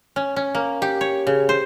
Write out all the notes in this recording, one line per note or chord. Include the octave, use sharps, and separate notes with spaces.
C#4
C#4
A#3
G4
C#5
C#3
C5